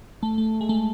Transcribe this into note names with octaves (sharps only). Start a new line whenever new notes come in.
A3
A3
G#3
A3